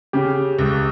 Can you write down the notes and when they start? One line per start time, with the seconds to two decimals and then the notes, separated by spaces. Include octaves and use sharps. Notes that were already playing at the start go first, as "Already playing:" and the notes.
0.13 C#3 G4
0.59 C#2